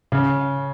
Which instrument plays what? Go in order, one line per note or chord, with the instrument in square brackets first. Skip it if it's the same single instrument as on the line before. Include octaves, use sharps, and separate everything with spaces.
[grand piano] C#3